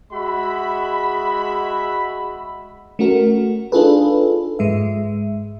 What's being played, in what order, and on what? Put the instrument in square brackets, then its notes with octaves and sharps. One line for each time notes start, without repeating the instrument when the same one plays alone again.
[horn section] G#3 F#4 E5 B5
[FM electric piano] A3 C#4 F#4 A#4
D4 D#4 F4 G#4 A4 B4
G#2 G#3 E5